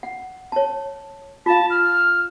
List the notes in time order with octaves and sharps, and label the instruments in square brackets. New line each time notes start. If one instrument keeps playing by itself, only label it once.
[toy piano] F#5
C#5 A5
[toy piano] F4 F5 [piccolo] A5
[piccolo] F6